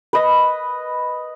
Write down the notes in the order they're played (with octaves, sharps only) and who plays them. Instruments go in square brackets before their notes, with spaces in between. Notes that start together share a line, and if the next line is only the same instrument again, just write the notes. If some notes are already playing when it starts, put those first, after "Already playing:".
[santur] B4 D#5